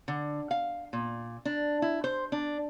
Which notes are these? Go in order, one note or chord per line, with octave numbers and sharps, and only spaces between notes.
D3
F5
A#2
D4
E4
C5
D4